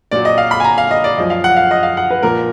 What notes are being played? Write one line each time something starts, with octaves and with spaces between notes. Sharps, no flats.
A#2 F#3 D5
D#5
F5
B5
G#5
A#5
F5
D#5
D5
F#2 F3 D#5
F5
F#5
F5
D#5
F5
F#5
B4
A#2 F3 A#4